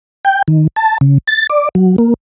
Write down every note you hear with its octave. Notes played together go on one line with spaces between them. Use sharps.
G5
D#3
A5
C#3
A6
D5
F#3
A#3